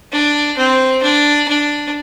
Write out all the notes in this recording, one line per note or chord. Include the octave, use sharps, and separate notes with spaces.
D4
C4
D4
D4